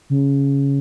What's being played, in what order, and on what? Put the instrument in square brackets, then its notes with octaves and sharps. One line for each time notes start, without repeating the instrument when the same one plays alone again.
[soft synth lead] C#3